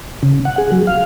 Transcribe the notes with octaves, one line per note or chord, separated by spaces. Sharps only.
C#3
F#5
G#4
F#3
F5